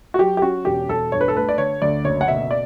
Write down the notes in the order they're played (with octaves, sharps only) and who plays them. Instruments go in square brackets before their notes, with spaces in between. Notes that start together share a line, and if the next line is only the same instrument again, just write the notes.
[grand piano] F#4
F#3 G4
G4
C#4 F#4
E1 G4
E1 A4
G2 C#5
B4
A4
A3 B4
D5
D3 C#5
D2 D5
F#1 C#5
F#5
B2 E5
D5